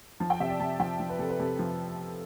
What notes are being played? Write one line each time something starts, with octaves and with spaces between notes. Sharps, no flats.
F3 A5
G5
C3 E5
D5
C3 A5
F3 G5
F3
B4
C3 A4
B4
C3 A4
F3